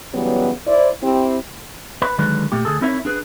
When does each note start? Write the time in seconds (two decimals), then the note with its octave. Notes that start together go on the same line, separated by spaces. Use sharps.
0.13 C#3 E3 F#3 G3 B3
0.66 E4 C5 D5
1.02 C4 E4 G4
2.02 B4
2.18 D3 D#3 F#3 G#3 B4
2.52 A#2 A3 G4
2.65 D2 G#4 A4
2.81 C4 D#4 E4 A#4 C#5 E5
3.05 D4 G#4 B4